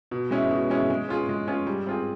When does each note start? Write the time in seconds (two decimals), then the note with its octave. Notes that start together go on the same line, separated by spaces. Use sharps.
0.11 B2
0.31 G#3 C#4 E4
0.51 B2
0.70 G#3 C#4 E4
0.90 G#3
1.08 C#4 F4 G#4
1.29 G#3
1.48 C#4 F4 G#4
1.67 G3
1.87 C4 F4 G#4